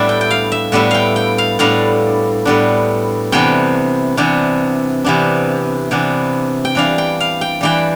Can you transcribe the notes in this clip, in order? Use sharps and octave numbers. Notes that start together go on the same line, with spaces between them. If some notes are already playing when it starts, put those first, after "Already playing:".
Already playing: A2 G3 B3 D4 D5 E5
G5
G5
F5
E5
A2 G3 B3 D4 E5
F5 G5
G5
F5
A2 G3 B3 D4 F5
A2 G3 B3 D4
C3 E3 B3 D4 G5
C3 E3 B3 D4
C3 E3 B3 D4
C3 E3 B3 D4
G5
E3 G3 D4 F5
G5
F5
G5
E3 G3 D4 G5